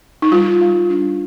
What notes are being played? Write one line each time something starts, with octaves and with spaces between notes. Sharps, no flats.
D#4
G3 F4
G3
D4